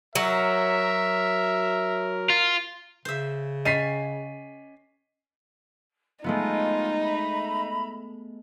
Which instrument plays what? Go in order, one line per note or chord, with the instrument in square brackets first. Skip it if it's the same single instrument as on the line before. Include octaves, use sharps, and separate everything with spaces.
[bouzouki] F#3 [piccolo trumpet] A#4 [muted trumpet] E5
[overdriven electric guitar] F4
[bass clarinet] C#3 [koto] C5 E5
[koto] C#4 [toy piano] D#5 G5 [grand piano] B6 C7 D#7
[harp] G#3 A3 B3 [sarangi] D#4 [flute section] F4
[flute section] E5 A#5 B5